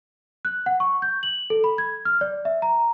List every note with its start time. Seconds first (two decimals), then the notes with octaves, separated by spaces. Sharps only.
0.45 F#6
0.66 F#5
0.80 C#6
1.02 G6
1.23 F#7
1.50 A4
1.64 B5
1.78 G#6
2.05 F6
2.21 D5
2.45 E5
2.62 A#5